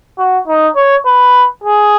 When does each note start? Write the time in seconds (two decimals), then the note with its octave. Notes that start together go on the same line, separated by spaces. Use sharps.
0.18 F#4
0.48 D#4
0.76 C#5
1.06 B4
1.64 G#4